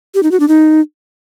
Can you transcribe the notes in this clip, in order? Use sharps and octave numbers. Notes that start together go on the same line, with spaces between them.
G4
D#4
F#4
D4
D#4